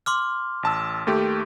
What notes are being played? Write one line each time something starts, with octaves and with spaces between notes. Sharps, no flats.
C6 D6 F6
A1 A5 E6
D#2 A3 G4